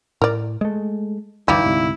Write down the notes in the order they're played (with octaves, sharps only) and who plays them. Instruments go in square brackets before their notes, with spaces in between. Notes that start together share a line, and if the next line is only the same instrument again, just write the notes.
[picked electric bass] A2 [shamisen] A#4 D5
[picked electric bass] G#3 A3
[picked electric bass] D2 G2 E3 [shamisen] D#3 G3 A#3 [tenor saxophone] E4
[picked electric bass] D2 G#2 C3